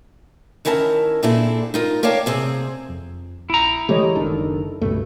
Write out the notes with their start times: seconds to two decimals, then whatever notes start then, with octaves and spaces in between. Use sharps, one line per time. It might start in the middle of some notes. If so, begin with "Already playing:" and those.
0.65 D#3 C#4 E4 A#4 E5 A5
1.23 A#2 C4 D4 E4 G#4 A4
1.74 D#4 F4 A#4
2.03 A#4 C#5 D5 F5 G5 A5
2.26 C3 C4 G#4 C5
2.89 F2
3.50 A#1 E4 A#5
3.89 E3 G#3 A3 G4 C#5 D#5
4.15 F#1 D#3 D4 A4
4.82 C#2 G2 B2 A3